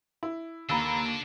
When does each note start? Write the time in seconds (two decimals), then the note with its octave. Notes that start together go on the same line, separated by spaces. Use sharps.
0.23 E4
0.69 D#2 A#3 D4 A4 A#5 B5 E6